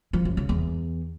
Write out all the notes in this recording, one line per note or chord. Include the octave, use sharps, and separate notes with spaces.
F3
F#2
C#3
E2